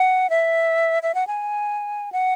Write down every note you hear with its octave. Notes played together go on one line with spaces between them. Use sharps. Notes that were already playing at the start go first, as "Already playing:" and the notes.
Already playing: F#5
E5
E5
F#5
G#5
F#5